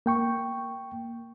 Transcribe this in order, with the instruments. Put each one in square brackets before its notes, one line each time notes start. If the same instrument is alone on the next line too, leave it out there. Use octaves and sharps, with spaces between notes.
[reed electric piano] A#3 G5 C#6